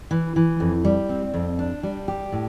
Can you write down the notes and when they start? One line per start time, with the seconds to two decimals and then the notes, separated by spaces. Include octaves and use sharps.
0.11 E3
0.36 E3
0.60 F2
0.85 G3
1.09 C4
1.34 F2
1.59 D4
1.83 G3
2.08 G4
2.32 A2